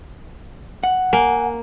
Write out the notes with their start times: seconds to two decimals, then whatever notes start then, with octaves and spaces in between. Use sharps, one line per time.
0.84 F#5
1.13 A#3 G#5